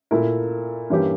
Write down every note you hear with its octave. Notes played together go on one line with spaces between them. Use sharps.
A#2 A3 E4 A#4
G2 E3 A#3 C#4 G4